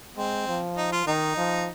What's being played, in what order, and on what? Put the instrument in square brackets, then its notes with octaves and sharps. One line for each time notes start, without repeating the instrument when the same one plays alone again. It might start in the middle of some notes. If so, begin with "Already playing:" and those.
[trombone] G#3 [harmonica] C4
[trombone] F3
[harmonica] D#4
F4
[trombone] D#3 [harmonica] D#4
[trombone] F3